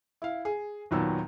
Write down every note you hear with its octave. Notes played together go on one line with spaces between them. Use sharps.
E4 F5
G#4
D#2 A#2 D#3 F#3 B3 E6